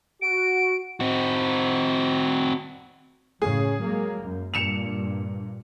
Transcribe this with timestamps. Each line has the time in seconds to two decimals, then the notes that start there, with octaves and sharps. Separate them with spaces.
0.22 F#4 D7
1.00 C4 F#4
3.42 F#2 A2 C#3 G#4
3.81 F#3 G#3 A#3
4.22 F#2
4.54 G2 A#2 C#7 E7 F7